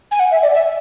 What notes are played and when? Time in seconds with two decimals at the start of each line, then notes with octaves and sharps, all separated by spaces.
0.11 G#5
0.19 F#5
0.31 E5
0.42 D5
0.54 E5